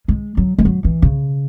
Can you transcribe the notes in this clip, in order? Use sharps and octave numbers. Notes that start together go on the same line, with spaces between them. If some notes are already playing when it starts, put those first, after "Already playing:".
G#3
F#3
G#3
F#3
E3
C#3